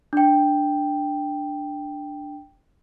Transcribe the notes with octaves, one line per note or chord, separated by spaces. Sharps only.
D4 G5